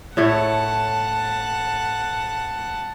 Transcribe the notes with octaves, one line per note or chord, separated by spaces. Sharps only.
A2 A3 C#5 F#5 A5